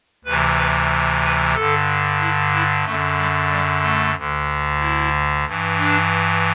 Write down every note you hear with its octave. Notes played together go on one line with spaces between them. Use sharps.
D2 C3 E3 B4
B4
B4
G2 D3 A4
E4
E4
F#2 D3 A3
G3
G3
A3
D2 D3
E4
G2 E3
D4